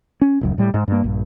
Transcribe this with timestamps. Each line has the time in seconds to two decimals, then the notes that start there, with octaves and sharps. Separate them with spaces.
0.21 C#4
0.41 D#1 C#2 F#2
0.58 A2 G3
0.74 G#2
0.88 G2 A#3
1.04 A#1 G2